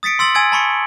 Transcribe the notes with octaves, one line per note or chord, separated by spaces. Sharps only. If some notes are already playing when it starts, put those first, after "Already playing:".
D#6 A6 B6 C#7 D7
C6 E6 A6 F#7
G#5 E6 G#6 A6 D7 F#7
A5 B5 C#6 C#7